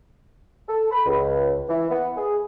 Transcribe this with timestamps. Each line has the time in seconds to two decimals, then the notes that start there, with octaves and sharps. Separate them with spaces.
0.68 A4
0.91 B5
1.05 C#2
1.69 E3
1.90 B3
2.17 G#4